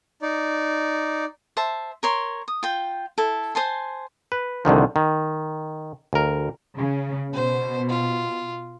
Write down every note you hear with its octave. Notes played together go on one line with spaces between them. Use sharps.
D#4 D5
C5 E5 A5
A#4 C#5 C6
D#6
F4 G5
E4 A4
C5 G#5 A5 C6
B4
C2 D3 D#3 F3
D#3
D2 A#4
C#3
B2 C5
F4